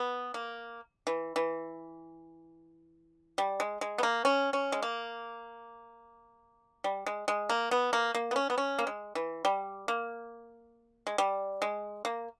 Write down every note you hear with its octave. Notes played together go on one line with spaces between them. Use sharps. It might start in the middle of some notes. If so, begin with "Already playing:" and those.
Already playing: B3
A#3
E3
E3
G3
G#3
G#3
B3
A#3
C#4
C#4
G#3
A#3
G3
G#3
G#3
A#3
B3
A#3
A#3
B3
C#4
B3
C#4
A#3
G#3
E3
G3
A#3
G#3
G3
G#3
A#3